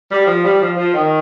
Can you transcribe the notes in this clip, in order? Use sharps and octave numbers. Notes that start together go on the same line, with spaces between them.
G3
F3
G3
F3
F3
D#3